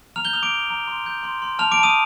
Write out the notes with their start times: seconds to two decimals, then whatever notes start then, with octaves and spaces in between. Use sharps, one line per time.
0.16 A#5 F6 F7
0.25 G6 G7
0.33 D#6 F6 F7
0.42 D6 D7
0.51 G6
0.70 A#5
0.87 C6
1.06 G6
1.23 C6
1.42 C6
1.59 A5 F6 F7
1.71 D6 D7
1.77 A5
1.83 D#6 D#7